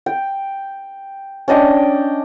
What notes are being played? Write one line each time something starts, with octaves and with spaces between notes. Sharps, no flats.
G5
C#4 D4 D#5 G5